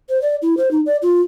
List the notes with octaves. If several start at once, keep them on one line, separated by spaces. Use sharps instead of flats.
C5
D5
E4
C5
D#4
D5
F4